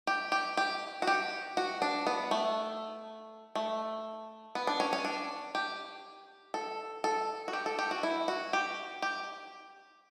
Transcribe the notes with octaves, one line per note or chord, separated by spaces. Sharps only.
G4
G4
G4
F#4
G4
F#4
D4
B3
A3
A3
B3
D4
C#4
C#4
D4
G4
A4
A4
F#4
G4
A4
G4
F#4
E4
F#4
G4
G4